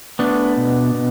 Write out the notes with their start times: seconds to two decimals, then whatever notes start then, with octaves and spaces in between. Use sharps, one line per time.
0.19 A3 B3 D4
0.57 B2
0.94 B2